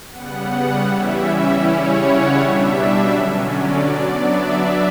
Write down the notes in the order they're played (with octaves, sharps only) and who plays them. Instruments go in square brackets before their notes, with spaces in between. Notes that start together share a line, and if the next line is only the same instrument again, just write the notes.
[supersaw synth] C#3 G3 B3 F#5
E3 G3 C#4 E4 E5
C#3 G3 C#4 E4 C#5
F#5
B2 G3 D4 E5
D3 F#3 C#4
D5
F#3 B3 D4 D5
E5